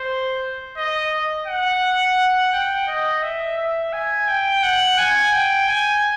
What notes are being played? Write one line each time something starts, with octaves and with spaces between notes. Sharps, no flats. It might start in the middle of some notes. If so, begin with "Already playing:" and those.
Already playing: C5
D#5
F#5
G5
D#5
E5
E5
G#5
G5
F#5
G#5
G5
G#5